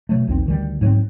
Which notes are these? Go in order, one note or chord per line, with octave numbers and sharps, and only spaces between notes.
B2 F#3 A3
A#1 D#2 C4
D2 D#3 G3
G#2 F#3 A#3 C4